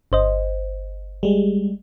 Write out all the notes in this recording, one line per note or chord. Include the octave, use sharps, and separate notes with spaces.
G1 C5 D#5
G3 G#3